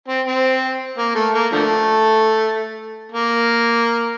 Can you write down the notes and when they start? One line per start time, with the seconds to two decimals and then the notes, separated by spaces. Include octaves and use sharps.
0.08 C4
0.26 C4
0.98 A#3
1.15 A3
1.34 A#3
1.52 D3 F3 A3
3.12 A#3